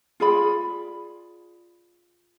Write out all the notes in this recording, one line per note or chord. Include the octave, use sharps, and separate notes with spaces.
F4 G#4 D5 B5